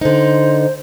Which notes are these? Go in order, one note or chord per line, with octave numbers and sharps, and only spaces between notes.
D3 D#4 C5